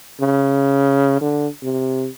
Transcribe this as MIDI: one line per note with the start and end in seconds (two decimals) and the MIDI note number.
0.21 1.18 49
1.21 1.48 50
1.63 2.07 48